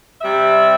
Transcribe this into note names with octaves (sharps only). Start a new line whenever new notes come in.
C3 G3 C4 E5